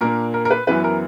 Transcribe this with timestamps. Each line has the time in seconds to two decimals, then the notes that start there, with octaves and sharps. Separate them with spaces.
0.01 A#2 A#3 D4 A#4
0.34 A#4
0.45 A#4
0.51 B4
0.67 F#2 E3 B3 E4 B4
0.84 A#4